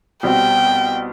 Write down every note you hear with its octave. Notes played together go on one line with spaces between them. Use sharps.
C2 B2 G3 C4 G5